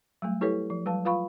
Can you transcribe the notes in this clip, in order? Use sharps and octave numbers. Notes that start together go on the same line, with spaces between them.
F#3 G3 A3
E4 G4 A4 B4 C#5
F3
F#3 G3 B4 F5 A5
F4 B4 F5 B5 C#6